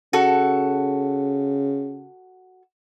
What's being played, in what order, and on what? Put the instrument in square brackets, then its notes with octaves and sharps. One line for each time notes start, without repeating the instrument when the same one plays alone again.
[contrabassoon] C#3 [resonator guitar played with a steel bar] F#4 A4